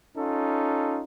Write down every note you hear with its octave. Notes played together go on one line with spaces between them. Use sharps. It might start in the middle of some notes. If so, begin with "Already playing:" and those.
C#4 D#4 F4 A4